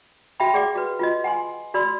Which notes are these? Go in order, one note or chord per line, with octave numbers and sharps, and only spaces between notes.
F#4 E5 G5 B5
G#4 D5 F#5 D6
F#4 B4
F4 F#4 D#5
F#5 G#5 C6
F#4 D5 B5 C6 E6